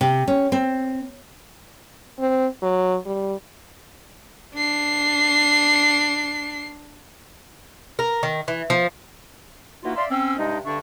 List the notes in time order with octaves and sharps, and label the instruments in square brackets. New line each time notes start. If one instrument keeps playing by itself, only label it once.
[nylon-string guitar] C3
C#4
C4
[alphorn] C4
F#3
G3
[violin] D4 C7
[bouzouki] A#4
D#3
E3
F3
[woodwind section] E3 A#3 D#4 F4 F#4
D5 E5 F5 C6
C4 C#4 E6
G2 C3 G#3 D4 D#4 D#5
G2 D3 D4 E5 C#6